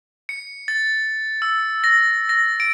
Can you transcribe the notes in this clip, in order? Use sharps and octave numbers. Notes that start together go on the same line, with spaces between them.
C#7
A6
E6
A#6
A#6
D7